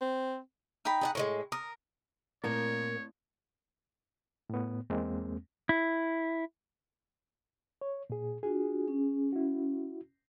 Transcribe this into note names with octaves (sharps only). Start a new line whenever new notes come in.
C4
D#4 G5 B5
G#4 D5 F#5
A2 E3 G#3 C#6
A#4 D#6
A#2 A3 A#3 C4 E4 A#4 C#5
A2 B3
E2 G#3 A#3 C4
E4
C#5
A#2 G#4
D4 F4 F#4 G#4
C#4
E4 F#4